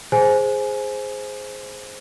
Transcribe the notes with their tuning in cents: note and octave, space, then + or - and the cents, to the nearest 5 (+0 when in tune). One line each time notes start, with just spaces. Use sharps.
G#4 +0 C5 +0 G#5 +20